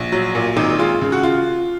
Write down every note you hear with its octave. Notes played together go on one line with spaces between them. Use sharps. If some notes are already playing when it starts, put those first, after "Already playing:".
Already playing: A#1
F#3
A#2
G#1 D#4
G#3 F4
C#3
F#4
F4